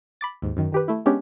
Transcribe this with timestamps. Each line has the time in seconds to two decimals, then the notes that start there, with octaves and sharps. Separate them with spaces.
0.21 B5 D6 A6
0.42 D#2 G#2
0.57 F#2 D#3
0.72 D#3 G4 B4
0.88 A3 E4
1.06 G#3 B3 C#4 D4 G4